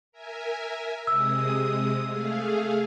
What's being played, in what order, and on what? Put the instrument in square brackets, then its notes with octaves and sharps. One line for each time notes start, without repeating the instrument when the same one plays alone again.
[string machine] A#4 E5 G#5
[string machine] C3 G#3 D#6 [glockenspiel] E6
[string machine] A3 G#4 F5